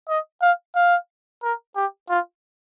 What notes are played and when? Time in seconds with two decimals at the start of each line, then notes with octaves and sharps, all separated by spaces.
0.09 D#5
0.42 F5
0.76 F5
1.43 A#4
1.76 G4
2.09 F4